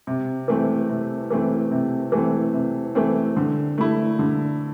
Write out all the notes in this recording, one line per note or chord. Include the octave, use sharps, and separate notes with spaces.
C3
E3 A3 C4
C3
E3 A3 C4
C3
E3 A3 C4
C3
E3 A3 C4
D3
A3 E4
D3